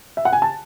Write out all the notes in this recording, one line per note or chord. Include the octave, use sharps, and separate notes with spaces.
E5
F#5
G#5
A5